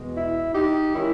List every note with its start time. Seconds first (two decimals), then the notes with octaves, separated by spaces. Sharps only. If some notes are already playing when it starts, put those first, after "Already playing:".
Already playing: E2 B2 G#3
0.14 E4
0.53 D#4 G4
0.93 D#3 G#3 C#4 E4